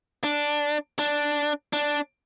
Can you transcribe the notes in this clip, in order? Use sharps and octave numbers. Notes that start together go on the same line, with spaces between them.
D4
D4
D4